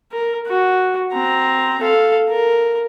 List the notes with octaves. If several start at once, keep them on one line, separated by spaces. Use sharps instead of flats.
A#4
F#4
C4 A#5
A4 F5
A#4